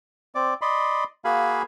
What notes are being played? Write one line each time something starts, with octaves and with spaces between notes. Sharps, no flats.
C4 D5
D5 D#5 B5 C6
A#3 F#4 G#4 F5 G#5 B5